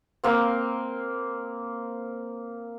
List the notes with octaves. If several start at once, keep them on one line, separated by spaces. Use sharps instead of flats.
A#3 C4